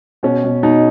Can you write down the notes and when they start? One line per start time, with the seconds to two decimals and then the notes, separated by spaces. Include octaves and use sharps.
0.23 B2 C#4
0.44 B2
0.63 B2 D#4